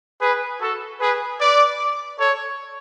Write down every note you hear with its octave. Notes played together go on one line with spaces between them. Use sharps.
G#4 B4
F#4 A4
G#4 B4
B4 D5
A4 C#5